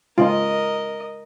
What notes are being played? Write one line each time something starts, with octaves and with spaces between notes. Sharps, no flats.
C#3 G#3 F4 A#4 D#5